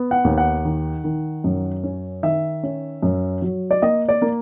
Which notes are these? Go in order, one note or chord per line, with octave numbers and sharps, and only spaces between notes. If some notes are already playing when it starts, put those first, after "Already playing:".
Already playing: B3
F#5
D#2
F#5
D#3
D#3
F#2
C#4
D#3 E5
C#4
F#2
F#3
D5
A#3 D#5
D5
A#3